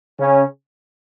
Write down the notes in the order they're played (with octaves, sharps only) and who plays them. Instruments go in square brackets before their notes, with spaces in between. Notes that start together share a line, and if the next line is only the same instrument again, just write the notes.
[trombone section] C#3 C#4